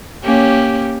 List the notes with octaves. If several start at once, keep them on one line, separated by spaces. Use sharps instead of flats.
A#3 C#4 G4